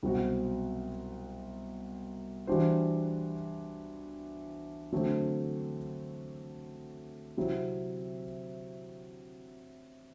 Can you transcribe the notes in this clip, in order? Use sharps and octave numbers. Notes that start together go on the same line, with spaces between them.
C2 B2 F#3 C4 F#4
E3 G3 D4 F#4 C5
D3 F#3 A3 C4 F#4
C3 F#3 C4 E4